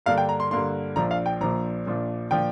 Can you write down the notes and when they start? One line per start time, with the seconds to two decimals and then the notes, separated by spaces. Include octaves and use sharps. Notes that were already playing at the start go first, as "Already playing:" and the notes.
0.06 G2 D3 A#3 D4 F5
0.18 G5
0.29 A#5
0.40 C6
0.51 G2 D3 A#3 D4 C6
0.96 A#1 A#2 F3 D4 A#5
1.11 F5
1.26 G5
1.41 A#1 A#2 F3 D4 A#5
1.86 A#1 A#2 F3 D4
2.31 A#2 F3 D4 G5